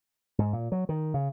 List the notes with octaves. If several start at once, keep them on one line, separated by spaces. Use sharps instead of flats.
G#2
A#2
F#3
D#3
C#3